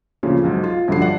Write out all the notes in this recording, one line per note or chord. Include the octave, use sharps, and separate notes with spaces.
D2 A#2 C#3 F3
B1 G#2
F4
A#1 G2 D3 F#3 C7
D4 F#5